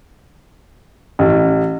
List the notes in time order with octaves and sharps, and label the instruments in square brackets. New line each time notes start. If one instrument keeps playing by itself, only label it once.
[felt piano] A1